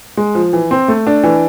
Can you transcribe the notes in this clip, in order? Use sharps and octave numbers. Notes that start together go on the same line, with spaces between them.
G#3
F3
E3
C4
A3
D4
E3